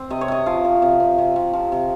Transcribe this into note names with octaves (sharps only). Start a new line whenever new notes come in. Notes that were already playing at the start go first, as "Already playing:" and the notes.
Already playing: C4
C3 D#5
C#5
C3 D#5
F3 F5
F3
C3
C4
C3
C3
F3
C3